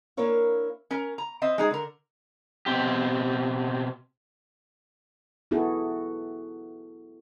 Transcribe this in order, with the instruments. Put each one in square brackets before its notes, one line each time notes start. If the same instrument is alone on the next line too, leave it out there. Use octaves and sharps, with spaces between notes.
[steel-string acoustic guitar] A#3 D4 E4 A#4 C#5 F5
[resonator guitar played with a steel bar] C#4 A#4
A#5
C4 D#5 E5
G#3 D#4 G#4
D3 A#4
[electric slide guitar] B2 C4 G4
[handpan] B3 E4 F#4 G#4 A4